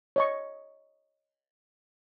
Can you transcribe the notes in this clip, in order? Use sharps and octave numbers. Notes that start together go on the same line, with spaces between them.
C#5 D#5 C#6